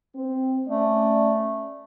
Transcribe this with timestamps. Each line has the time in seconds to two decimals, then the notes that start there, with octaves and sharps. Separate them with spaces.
0.15 C4
0.67 A3 C#4 D5